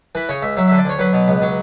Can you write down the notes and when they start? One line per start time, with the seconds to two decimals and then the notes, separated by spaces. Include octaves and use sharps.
0.15 E3 B4
0.29 C#3 C#5
0.42 C#2 E5
0.57 F#3 E5
0.68 D3 E5
0.78 D5
0.85 D2 C#5
0.99 F#3 B4
1.13 B2
1.28 C#2
1.42 F#3